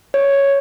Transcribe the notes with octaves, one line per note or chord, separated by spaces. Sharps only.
C#5